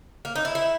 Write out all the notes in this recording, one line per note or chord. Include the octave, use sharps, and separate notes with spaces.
A#3
D#4
E4
E4